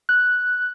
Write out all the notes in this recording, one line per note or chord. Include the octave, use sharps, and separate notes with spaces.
F#6